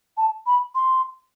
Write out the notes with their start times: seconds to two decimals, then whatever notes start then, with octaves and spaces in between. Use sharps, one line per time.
0.17 A5
0.46 B5
0.75 C6